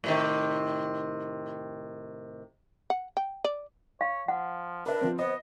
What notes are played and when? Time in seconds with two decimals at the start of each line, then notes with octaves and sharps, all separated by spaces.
0.04 A2 C3 D#3
2.90 F#5
3.17 G5
3.44 D5
4.01 C#5 F5
4.28 F3 F#5
4.86 D4 A#4 B4 E5
5.01 F3 C4
5.19 B3 C5 D#5